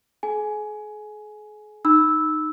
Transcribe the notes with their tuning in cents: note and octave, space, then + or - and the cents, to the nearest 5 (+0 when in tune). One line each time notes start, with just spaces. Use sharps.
G#4 +40 G#5 +15
D#4 -20 B5 +0 E6 -10